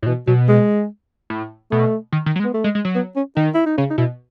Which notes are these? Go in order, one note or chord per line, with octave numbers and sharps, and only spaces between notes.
A2
B2 E3
B2 F#3
G#3
A2
B2 A3
D#3
D#3
F#3
G#3
B3
A3
G#3
G#3
F#3
B3
C#4
D#3 D#4
E4
D#4
C#3 C#4
D#4
B2 E4